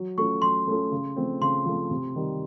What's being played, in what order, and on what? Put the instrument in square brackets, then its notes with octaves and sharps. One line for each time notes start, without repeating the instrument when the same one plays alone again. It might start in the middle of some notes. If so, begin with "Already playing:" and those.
Already playing: [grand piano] F#3
[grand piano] A3 C#4 F4 A4 [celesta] C#6
[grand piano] F#3 [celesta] C6
[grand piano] A3 C#4 F4 A4
C#3
F3 A3 C4
[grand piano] C#3 [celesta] C6
[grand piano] F3 A3 C4
C3
D#3 G3